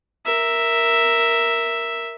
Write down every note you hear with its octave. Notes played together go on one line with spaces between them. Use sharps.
A#4 E5